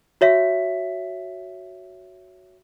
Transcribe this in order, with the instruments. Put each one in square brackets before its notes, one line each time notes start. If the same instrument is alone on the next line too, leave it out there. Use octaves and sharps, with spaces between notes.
[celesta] F#4 C#5 E5 B6